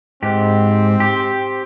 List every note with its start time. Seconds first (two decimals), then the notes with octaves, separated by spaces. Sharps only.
0.23 G#2 C4 G4
1.00 G4